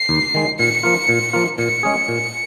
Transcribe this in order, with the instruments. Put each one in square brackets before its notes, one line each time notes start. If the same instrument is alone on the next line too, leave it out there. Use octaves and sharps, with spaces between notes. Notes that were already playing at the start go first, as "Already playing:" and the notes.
Already playing: [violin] C7
[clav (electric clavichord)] D#2
D#3 G#3
[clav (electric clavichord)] A#2 [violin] C#7
[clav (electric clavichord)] F3 A#3 F4
A#2
F3 A#3 F4
[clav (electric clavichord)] A#2 [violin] C#7
[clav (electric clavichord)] G#3 C#4 G#4
A#2